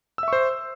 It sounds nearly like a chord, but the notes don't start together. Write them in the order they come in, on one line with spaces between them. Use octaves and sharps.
E6 E5 C#6 C5